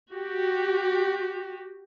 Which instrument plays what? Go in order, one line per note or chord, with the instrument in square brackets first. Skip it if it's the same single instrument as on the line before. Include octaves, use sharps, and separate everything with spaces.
[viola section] F#4 G4